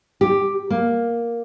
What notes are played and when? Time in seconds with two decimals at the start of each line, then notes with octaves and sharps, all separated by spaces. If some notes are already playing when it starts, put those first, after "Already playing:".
0.21 G4
0.70 A#3